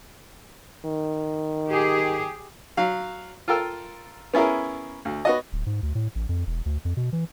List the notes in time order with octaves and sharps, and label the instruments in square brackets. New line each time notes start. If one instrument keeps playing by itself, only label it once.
[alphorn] D#3
[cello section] G4 G#4
[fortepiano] F#3 F5
F4 A4 A#4 G5 E6
B3 C#4 E4 G#4 A#4
D2
B3 F#4 D#5
[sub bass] D1
G#2
D2
A2
A1
F2
E1
D2
F2
B2
E3